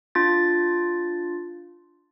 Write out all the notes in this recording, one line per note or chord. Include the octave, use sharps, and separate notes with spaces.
D4 F4 A6